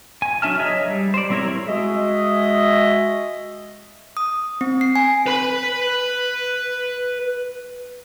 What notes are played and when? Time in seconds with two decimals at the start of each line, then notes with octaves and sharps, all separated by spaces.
0.22 G#5
0.42 F#3 D4 E5 A5 F6
0.59 G#4 C#5 D#5 E5 A#5
0.88 G3
1.14 C5 D5
1.30 G3 C4 E4 A#4 C#5
1.67 G#3 F#4 G#4 D#5 E5
4.17 D#6
4.61 C4
4.81 C7
4.96 G#5
5.26 B4 B5